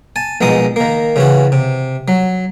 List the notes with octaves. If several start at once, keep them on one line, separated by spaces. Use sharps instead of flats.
G#5 A5
A#1 B2 G#3 D#4 D#6
D#3 A#3
C#3 E3 F#4
C3
F#3